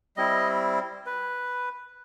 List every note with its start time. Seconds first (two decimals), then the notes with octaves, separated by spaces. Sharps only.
0.17 G3 C4 E4 D#5
1.06 B4